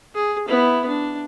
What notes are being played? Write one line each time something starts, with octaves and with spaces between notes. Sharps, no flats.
G#4
B3 E4
D4